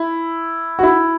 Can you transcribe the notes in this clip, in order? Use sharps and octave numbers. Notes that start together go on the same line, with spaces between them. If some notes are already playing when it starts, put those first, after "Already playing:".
Already playing: E4
F#4
E4